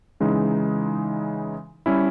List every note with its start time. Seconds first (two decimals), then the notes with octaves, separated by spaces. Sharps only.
0.20 C#3 E3 G#3 D#4
1.86 G3 C#4 E4